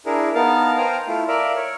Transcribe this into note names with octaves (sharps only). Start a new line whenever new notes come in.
D4 E4 G#4 A#4
B3 D#4 A#4 F5 A5
C5 F5 G5 G#5 A#5
A3 E4 F4
A#4 D5 E5 F5
C#5